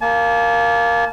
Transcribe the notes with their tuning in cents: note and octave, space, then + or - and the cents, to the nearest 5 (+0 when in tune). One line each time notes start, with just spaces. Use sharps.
A#3 +0 A5 -40